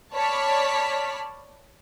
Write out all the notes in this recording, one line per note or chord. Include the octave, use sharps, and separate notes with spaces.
C#5 D5 A5 B5 F6 B6